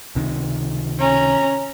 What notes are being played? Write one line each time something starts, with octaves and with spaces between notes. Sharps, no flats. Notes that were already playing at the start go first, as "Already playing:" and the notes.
C#2 C3 D#3
C#4 A#5